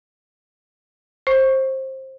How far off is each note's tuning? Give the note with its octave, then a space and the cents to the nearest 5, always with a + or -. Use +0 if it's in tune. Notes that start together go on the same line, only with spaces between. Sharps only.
C5 +20 C#6 +0